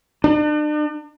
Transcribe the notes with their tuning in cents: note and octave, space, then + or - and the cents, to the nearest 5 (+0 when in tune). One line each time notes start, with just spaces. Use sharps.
D4 +40